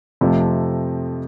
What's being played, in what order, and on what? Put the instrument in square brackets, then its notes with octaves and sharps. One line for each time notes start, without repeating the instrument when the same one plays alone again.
[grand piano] F2 C3 F3 A3